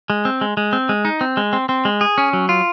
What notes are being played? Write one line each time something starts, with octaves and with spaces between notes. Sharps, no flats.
G#3
C4
G#3
G#3
C4
G#3
D#4
C4
G#3
C4
C4
G#3
G#4
C#4
F#3
F4